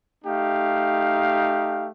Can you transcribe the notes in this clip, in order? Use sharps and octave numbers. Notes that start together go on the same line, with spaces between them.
A3 D#4 G4 F5